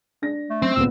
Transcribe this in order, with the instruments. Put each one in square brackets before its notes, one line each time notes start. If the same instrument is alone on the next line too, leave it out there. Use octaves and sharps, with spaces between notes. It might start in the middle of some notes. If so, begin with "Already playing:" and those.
[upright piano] D4 A#6
[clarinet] A3
[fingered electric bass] F#3 C#4 [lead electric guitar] C4
[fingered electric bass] D#1 C#2 G2 [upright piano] A#2 B3 [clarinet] E6